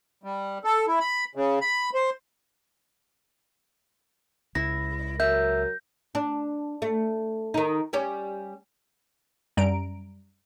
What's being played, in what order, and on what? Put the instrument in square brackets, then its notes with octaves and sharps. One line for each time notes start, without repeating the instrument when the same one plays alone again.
[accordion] G3
A4
E4
B5
C#3
B5
C5
[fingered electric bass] C#2 [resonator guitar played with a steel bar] E4 [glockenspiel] A#6
[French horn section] F#3 A#4 [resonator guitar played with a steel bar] E5 [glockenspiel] G6
[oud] D4
A3
D#3 D#4
G3 C#4 G4
[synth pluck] F#2 G3 A#5 D7